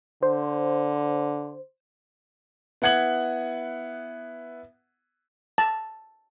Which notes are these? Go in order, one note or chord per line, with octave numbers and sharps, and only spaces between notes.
D3 C5
B3 E4 F#5 G#6 F#7
A5